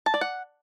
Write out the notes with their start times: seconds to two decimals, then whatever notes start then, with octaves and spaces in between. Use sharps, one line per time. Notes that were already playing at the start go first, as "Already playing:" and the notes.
0.06 A5
0.14 D5
0.21 F#5